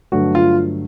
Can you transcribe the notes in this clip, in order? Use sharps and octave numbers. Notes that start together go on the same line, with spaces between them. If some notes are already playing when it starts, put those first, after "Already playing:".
G2 D3 F#3 A3 F#4
F4